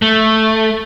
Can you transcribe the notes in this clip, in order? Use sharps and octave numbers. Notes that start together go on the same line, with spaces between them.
A3